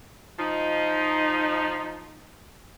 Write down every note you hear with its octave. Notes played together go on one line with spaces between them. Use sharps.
F3 D#4